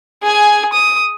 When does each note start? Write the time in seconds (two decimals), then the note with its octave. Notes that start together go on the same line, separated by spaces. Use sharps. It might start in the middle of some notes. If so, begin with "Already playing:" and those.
0.23 G#4 G#5
0.73 D#6